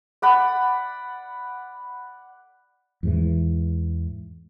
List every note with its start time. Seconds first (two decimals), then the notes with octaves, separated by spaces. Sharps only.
0.22 D5 F#5 B5
3.03 E2 G#2 E3